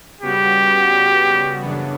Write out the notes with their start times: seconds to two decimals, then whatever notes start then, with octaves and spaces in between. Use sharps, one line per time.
0.21 C#3 G3 B3 F#4 G4
1.62 F#2 C#3 E3 B3 D4